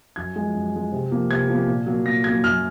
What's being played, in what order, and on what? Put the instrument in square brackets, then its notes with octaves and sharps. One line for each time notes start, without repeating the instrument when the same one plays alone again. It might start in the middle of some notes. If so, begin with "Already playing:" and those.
[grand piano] F#2 G#6
F3 G#3
F#2
F3 G#3
C3
F3 A#3
C3 G#6
F3
A#3
A#2
F#3 A#3
A#2 A#6
F#3 A#3 G#6
F#2 F6